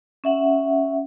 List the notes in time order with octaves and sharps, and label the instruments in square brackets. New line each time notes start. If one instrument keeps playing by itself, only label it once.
[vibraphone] C#4 E5 F#5